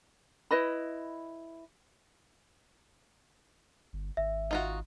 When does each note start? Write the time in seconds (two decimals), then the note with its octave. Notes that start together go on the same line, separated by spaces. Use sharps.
0.51 E4 B4 D#5 B5
3.93 G1
4.17 G#1 E5
4.51 D#4 F4 F#4